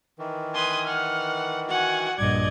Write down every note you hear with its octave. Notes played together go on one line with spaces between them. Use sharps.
D#3 E3
B4 G#5 C6 D#6
F#5 F6
F#4 F#5 G#5
A#1 G2 D5 D#5 G#6